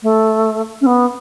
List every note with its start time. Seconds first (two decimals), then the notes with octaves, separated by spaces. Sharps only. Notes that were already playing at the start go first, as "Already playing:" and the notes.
0.03 A3
0.81 C#4
0.86 B3